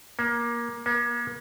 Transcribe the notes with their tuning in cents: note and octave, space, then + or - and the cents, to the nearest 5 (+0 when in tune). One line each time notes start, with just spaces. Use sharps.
A#3 +20
A#3 +40